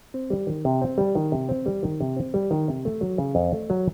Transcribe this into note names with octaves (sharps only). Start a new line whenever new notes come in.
C4
G3
D#3
C3
C4
G3
D#3
C3
C4
G3
D#3
C3
C4
G3
D#3
C3
A3
F#3
C#3
F2
A3
F#3